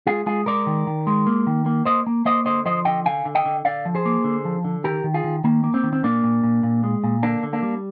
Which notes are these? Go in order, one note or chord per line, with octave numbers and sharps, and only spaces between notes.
G#3 F4 G#4
G#3 F4 G#4
G#3 A#4 D5
D#3
D#3
G#3
A#3
D#3
A#3
A#3 C5 D#5
A#3
A#3 C5 D#5
D3 C5 D#5
F3 C5 D#5
D3 D#5 G5
D3 F5 G#5
D3
D#5 G5
D3
D3 D5 F5
F3
G#4 C5
A#3
D3
F3
D3
D#3 G4 A#4
D#3
F4 G#4
D#3
D#3 A#3
A#3
C4
D#3
C4
A#2 A#3 D4
A#2
A#2
A#2
G#3
A#2
D3 A#3 D4
D3
A#3 D4
G3